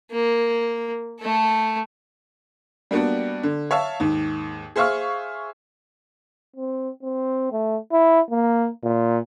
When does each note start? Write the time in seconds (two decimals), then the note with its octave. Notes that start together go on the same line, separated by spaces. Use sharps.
0.11 A#3
1.20 A3 A4
2.91 G3 A#3 B3 D4 F#4
3.43 D3
3.71 C#5 E5 F5 A5
4.00 D#2 G#2
4.76 G#4 C5 E5 F5 C#6 F6
6.56 C4
7.03 C4
7.52 A3
7.92 E4
8.31 A#3
8.83 A#2